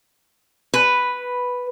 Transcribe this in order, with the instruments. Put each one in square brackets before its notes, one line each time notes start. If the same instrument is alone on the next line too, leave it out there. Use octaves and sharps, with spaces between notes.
[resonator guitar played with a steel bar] B4